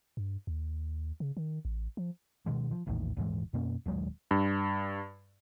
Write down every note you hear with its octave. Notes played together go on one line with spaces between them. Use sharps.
G2
D#2
C#3
D#3
A1
F3
B2 D#3 G#3
F3
A#1 E2 A2 D#3
D#1 G#2 E3 G#3
F#2 B2 A#3 C#4
D#1 D#2 F#3 G#3
G2